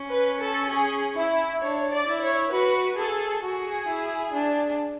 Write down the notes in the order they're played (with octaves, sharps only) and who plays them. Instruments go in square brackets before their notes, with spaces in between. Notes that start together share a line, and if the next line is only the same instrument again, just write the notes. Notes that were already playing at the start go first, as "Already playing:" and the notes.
Already playing: [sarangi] C#4
[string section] B4
A4
G#4
E4
[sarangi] D4 [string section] C#5
[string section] D5
[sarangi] E4
[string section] C#5
[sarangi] F#4 [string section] B4
[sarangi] G#4 [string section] A4
[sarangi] F#4 [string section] G#4
[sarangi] E4
D4